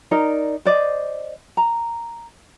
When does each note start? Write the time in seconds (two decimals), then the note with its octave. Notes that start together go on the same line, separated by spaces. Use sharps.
0.11 D#4 A#4 D5
0.65 C5 D5 D#5
1.57 A#5